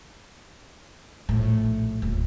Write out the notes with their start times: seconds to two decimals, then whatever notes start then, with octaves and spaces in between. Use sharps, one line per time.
1.29 A#1 A2
2.02 D#1 D2